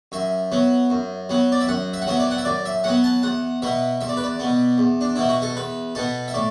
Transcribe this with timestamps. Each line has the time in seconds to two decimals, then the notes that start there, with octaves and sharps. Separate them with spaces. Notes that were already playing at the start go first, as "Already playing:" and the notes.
0.12 F#2 E5
0.52 F#3 B3
0.90 F#2
1.29 F#3 B3
1.52 D5
1.61 E5
1.68 F#2 F#5
1.93 E5
2.02 F#5
2.07 F#3 B3 E5
2.19 D5
2.31 F#5
2.38 E5
2.45 F#2 D5
2.65 E5
2.84 F#3 B3 F#5
3.04 A5
3.23 E2 F#5
3.62 B2 B3 E5
4.01 E2 E5
4.09 D5
4.17 B4
4.24 D5
4.40 B2 B3
4.78 E2
5.01 D4
5.16 B2 B3 E4
5.29 F#4
5.42 A4
5.56 E2 B4
5.95 B2 B3 A4
6.28 E5
6.34 A2 D5